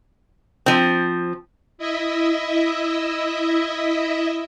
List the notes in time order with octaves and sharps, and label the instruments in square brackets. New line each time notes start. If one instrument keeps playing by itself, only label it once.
[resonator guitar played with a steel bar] F3 C4
[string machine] E4 D#5 E5